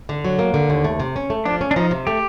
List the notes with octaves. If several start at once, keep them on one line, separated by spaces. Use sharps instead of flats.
D3
F#3
A#3
D3
D#2
A3
C3
C#4
A3
F3 D4
C#4
D4
F3 D#4
C3
A3 G4